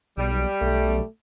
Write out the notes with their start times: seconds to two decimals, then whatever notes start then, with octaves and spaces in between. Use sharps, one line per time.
0.17 B1 G3
0.61 B1 A3